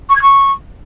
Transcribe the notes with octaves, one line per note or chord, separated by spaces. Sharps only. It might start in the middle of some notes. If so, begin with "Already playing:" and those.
C#6
G#6
C#6